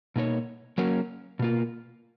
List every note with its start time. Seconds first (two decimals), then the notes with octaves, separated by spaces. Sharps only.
0.16 B2 A#3 D#4 A#4 C#5
0.78 F#3 A#3 C#4 F#4 A#4
1.39 B2 A#3 F4